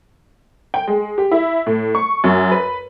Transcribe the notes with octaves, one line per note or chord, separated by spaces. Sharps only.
G5
G#3
G4
E4
A2
C#6
F#2
B4